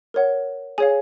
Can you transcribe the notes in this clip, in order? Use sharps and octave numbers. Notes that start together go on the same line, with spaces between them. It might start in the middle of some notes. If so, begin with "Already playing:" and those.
A#4 C#5 F#5
G#4 C#5 F5 G#5